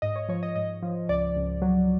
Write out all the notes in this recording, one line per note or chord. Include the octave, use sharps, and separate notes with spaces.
G#2 D#5
C#5
F3 C#5
D#5
G#2 D#5
F3
C#2 D5
C#2
F#3